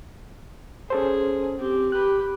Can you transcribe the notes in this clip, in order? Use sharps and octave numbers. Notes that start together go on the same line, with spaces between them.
C#4 G#4 A4 C5
C4 G4
G4 B4 F#6